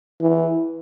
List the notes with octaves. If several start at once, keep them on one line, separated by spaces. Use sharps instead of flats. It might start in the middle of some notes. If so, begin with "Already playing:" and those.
E3